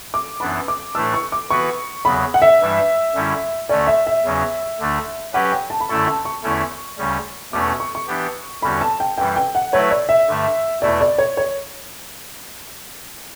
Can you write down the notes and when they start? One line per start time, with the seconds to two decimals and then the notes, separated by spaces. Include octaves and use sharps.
0.14 D6
0.40 F#2 E3 B3 D4 B5
0.68 D6
0.95 A2 E3 A3 D4 E6
1.14 C#6
1.32 D6
1.50 E3 B3 F#4 B4 C#6
2.05 E2 C#3 F#3 B3 B5
2.34 F#5
2.42 E5
2.61 G2 E3 G3 D4
3.14 F#2 D3 G3 C#4 E4
3.69 D2 D3 A3 C#4 D5
3.87 E5
4.07 E5
4.24 E2 C#3 F#3 C#4
4.79 D2 D3 A3 D4
5.34 F#3 C#4 G4 B4 F#5
5.52 G5
5.70 A5
5.80 B5
5.89 F#2 D3 A3 E4 A4 C#6
6.07 A5
6.25 C#6
6.43 E2 D3 A3 C#4 E4
6.98 D2 C#3 G3 C#4
7.53 E2 B2 A3 C#4 D6
7.68 C#6
7.80 C#6
7.95 C#6
8.08 E3 B3 D4 G4
8.62 E2 D3 G3 C#4 F#4 B5
8.81 A5
9.00 G5
9.18 F#2 E3 G3 G5
9.36 G5
9.55 F#5
9.72 F#3 A3 E4 B4 C#5
9.91 D5
10.09 E5
10.27 G2 D3 A3
10.82 E2 B2 A3 E4 D5
11.01 D5
11.18 C#5
11.37 C#5